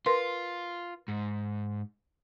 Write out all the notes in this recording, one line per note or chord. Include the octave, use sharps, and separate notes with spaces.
F4 A#4 B4 C6
G#2